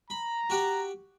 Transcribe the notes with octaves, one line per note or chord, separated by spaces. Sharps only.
A#5 B5
F#4 G4 F#5